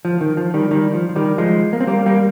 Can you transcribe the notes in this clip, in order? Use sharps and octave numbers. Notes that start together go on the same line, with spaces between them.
F3
D#3
F3
D#3 G3
D#3 G3
F3
F3
D#3 G3
F3 G#3
A#3
C4
G3 A#3
G3 A#3